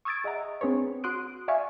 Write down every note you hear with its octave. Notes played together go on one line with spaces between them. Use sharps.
C#6 D#6 E6 G#6 A6 D7
G#4 D#5 E5 F#5 A#5
C4 D4 G#4 B4 C#5
F#4 C6 D#6 F#6 D7
D5 E5 F5 G#5 C#6